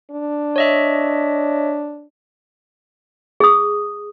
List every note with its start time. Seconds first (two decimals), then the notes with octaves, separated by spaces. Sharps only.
0.11 D4
0.56 C#5 D#5 E5
3.40 G#4 D#6